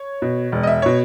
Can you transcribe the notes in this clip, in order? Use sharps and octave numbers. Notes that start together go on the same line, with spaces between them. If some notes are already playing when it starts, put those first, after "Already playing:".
Already playing: C#5
B2
E1
D#5
E5
B2 C#5